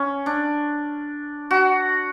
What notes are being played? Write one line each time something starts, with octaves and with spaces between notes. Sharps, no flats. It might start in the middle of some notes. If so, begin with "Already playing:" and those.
Already playing: C#4
D4
F#4